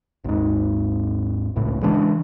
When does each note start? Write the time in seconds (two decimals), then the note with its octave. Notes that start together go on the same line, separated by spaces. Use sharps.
0.24 G#1 D#2 G#2
1.56 G#1 C#2 A2
1.83 C#3 E3 G#3 D4